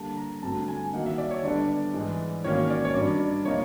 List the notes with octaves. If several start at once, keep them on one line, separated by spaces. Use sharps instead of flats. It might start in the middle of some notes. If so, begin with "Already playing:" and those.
Already playing: D3 G3 A#3 A5
A#5
G2 D3 F#3 A3 C4 A5
G#5
D#3 F#3 A#3 D#4 F#5
E5
D5
C#5
D3 G3 B3 D4 D5
G#2 E3 G#3
G#2 D#3 F#3 A#3 C#4 C#5
D5
C#5
G2 D#3 F#3 D5
C3 F3 A#3 D#4 C#5